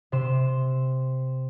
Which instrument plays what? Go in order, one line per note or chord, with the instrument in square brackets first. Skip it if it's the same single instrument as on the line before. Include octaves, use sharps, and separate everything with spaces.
[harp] C3 C6 E7